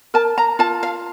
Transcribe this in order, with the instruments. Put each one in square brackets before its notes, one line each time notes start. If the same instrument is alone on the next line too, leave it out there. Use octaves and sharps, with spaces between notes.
[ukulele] A#4 A5
A#5
F4 A5
F5